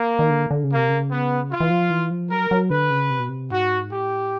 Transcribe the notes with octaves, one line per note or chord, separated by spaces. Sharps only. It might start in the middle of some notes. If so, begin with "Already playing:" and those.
Already playing: A#3
D#3
D3
D3
C#3
A#3
C3
C#3
B3
F4
E3
F3
E3
F3
F#3 A#4
F#3
D3 B4
C#3
C3
B2
C3
G#2 F#4
A2 G4